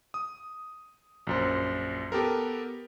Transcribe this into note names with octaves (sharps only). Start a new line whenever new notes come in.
D#6
A#1 F#2 C5
B3 G4 A4 A#4